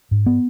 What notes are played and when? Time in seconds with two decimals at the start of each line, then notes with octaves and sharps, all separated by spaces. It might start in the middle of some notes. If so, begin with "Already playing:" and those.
0.11 G#2
0.26 B3